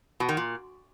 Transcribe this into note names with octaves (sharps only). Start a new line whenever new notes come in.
B2
D#3
A#2